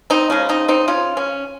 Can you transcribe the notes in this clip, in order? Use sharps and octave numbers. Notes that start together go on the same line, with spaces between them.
C4 D#4
C#3 F3 G#3 C#4
C4 D#4
C4 D#4
C#4 F4
C#4